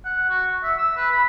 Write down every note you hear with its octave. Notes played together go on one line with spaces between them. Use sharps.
F#5
F#4
F#5
E5
E6
B4
B5